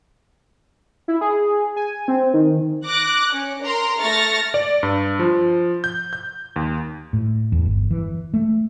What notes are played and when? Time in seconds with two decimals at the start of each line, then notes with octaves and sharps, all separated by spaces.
1.08 E4
1.21 G#4
1.76 G#5
2.08 C4
2.34 D#3
2.87 D6 F#6 A#6
3.33 C#4
3.64 A#4 A#5 C6
4.00 A3 C#6 F6 A6 A#6
4.54 D5
4.83 G2
5.19 F3
5.84 G6
6.13 G6
6.56 D#2
7.13 A2
7.52 E2
7.65 G1
7.91 E3
8.34 A3